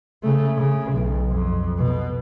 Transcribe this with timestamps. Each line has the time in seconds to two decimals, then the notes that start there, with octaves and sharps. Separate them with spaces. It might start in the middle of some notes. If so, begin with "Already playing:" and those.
0.23 C#3 A3
0.57 C#3
0.92 B1
1.29 F2
1.78 B2